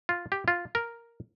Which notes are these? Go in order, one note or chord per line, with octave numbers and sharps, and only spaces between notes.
F4
G4
F4
A#4